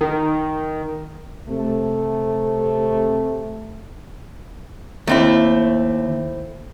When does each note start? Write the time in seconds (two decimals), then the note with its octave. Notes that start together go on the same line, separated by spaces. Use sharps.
0.01 D#3
1.49 C3 A3
5.07 D#2 A3 C4 E4